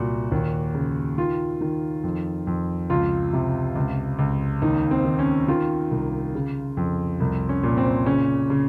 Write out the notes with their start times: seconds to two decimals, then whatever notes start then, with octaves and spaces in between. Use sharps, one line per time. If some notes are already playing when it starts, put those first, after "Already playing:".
Already playing: C2 A#2 F#4
0.32 D#2
0.75 C#3
1.18 D#3 F4
1.61 D#3
2.04 F2
2.47 F2
2.90 C#2 F4
3.33 C3
3.75 C#2
4.19 C#2
4.62 D#2 D#4
4.91 C4
5.05 D#3
5.19 C#4
5.48 D#3 F4
5.91 C2
6.35 C#3
6.77 F2
7.20 C2
7.49 C#4
7.63 A#2
7.77 C4
8.06 C#3 C#4
8.50 C#3